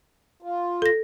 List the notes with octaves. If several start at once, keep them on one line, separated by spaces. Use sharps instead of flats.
F4
A4 A#6